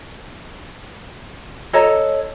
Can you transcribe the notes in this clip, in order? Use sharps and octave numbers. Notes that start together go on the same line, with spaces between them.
A4 C#5 D#5 A#5